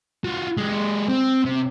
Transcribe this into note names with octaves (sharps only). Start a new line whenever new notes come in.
F4 F#4
G#3 G4
C4
C3